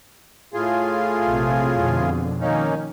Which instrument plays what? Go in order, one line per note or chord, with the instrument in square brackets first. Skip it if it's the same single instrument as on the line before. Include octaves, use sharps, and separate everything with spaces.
[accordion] A2 F4 G#4
[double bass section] A#1 C3
F2 B2 D3
[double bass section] D#3 [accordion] A#3 C#4 D#4